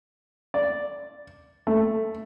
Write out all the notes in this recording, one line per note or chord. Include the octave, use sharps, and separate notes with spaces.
D5
A3